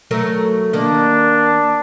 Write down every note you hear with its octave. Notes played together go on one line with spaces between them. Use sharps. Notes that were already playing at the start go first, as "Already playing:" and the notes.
F#3 A3 A#4
D#3 A#3 D4